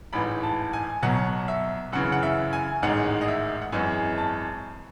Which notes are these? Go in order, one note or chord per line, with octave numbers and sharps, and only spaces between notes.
A1 G#2 E3 B5
A5
G#5
B1 B2 F#3 F#5
E5
F#2 C#3 E3 F#5
F#5
E5
G#5
A1 G#2 D#3 G#3 F#5
D#5
E5
F#5
G#1 F#2 E3 G#3 G#5
A5